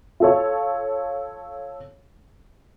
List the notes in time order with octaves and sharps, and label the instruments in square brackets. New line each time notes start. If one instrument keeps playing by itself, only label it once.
[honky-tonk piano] F4 A4 C#5